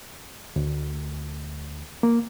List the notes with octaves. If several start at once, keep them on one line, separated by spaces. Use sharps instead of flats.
D2
A#3